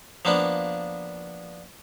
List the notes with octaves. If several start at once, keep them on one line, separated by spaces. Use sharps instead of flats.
F3 A#3 B3 D4